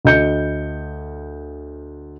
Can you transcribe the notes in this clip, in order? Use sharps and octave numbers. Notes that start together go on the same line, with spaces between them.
D2 D#5 G6 C#7